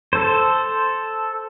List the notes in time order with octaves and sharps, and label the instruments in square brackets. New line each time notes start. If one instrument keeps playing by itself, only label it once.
[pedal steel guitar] A4 C5